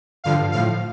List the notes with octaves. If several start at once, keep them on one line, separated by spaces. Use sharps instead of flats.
G2 D3 F3 F5
A2 F3 F5